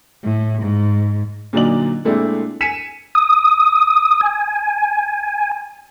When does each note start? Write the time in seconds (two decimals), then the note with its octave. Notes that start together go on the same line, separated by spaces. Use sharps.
0.24 A2
0.61 G#2
1.53 A#2 D3 F#3 D#4 D5 F#7
2.05 A#2 G#3 A3 C4 D4 E4
2.61 G#5 B6 C#7 D#7 E7
3.15 D#6
4.21 G#5